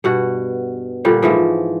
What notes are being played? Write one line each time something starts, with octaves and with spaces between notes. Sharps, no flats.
G2 B2 F#4
A#2 D3 G3
G#2 E3 F3